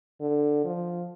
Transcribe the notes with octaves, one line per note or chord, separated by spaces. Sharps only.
D3
F3